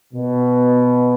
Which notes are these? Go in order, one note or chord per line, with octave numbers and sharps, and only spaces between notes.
B2